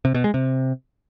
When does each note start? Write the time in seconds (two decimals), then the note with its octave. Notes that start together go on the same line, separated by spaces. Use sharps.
0.05 C3
0.14 B2
0.24 G#3
0.34 C3